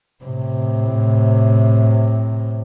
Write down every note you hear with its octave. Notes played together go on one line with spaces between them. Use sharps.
A2 C3